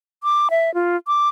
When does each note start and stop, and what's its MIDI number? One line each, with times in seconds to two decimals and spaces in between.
0.23 0.48 86
0.50 0.73 76
0.74 0.96 65
1.07 1.29 86